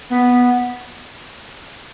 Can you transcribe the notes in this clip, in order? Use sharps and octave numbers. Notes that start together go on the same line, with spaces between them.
B3